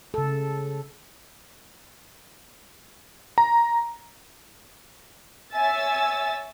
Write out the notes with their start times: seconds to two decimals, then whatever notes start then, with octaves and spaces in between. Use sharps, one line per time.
0.14 C#3 A4
3.38 A#5
5.55 C#5 E5 G#5 E6 A6